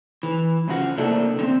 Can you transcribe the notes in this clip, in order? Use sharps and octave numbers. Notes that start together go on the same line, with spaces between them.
E3
F2 C#3 F3 F#4
C3 A3 A#3 D4 E4
D3 C4